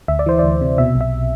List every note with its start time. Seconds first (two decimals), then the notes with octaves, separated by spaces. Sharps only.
0.08 D2 E5
0.19 D5
0.26 E3 C5
0.39 D2 D5
0.61 C3
0.78 B2 E5
0.95 B1
1.01 E5